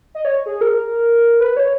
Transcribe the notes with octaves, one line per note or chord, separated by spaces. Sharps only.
D#5
C#5
G#4
A#4
B4
C#5